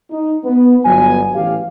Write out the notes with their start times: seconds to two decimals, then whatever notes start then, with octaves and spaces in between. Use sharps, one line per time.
0.11 D#4
0.45 B3
0.85 G1 F#3 B3 G#5
1.35 A1 G4 F5